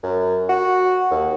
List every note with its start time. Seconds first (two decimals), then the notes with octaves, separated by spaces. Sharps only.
0.03 F#2
0.49 F#4
1.11 D#2